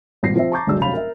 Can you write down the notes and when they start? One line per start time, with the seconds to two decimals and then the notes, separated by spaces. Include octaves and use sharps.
0.23 G#1 G2 A#2 A#6 C7
0.36 F3 C4 E5
0.52 A5 A#5 C#6 D6 G6 A6
0.67 G1 D2 F#3 G#3 D4 E6
0.81 F1 F#3 C#4 F5 B5 F7
0.93 A#4 E5